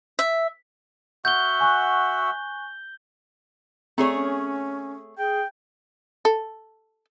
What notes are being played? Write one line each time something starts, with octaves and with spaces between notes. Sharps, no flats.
E5
F#4 E5 F#5 G6 G7
G#5 C#6 F#6
A3 C4 G#4 C#5
C#4
G#4 G5
A4